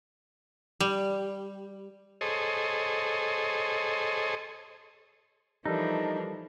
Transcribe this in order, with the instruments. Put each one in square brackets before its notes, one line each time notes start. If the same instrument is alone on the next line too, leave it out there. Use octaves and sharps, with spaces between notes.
[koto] G3
[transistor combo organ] G#4 A4 C5 C#5 D#5
[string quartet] E3 F3 D4 [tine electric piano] G3 A4 A#4 [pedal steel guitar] D#4